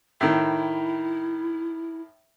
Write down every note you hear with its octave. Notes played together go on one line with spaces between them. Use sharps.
A2 D#3 E4